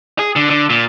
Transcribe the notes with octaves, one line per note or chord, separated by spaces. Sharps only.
G#4
D3
D3
A#2